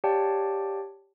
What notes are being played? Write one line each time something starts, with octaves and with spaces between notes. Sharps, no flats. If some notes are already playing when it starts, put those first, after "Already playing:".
G4 C#5 D5 F5 G5 A5